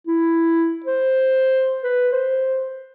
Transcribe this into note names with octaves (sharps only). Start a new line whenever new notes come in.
E4
C5
B4
C5